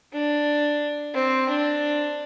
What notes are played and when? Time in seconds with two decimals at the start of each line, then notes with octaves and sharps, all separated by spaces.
0.13 D4
1.15 C4
1.49 D4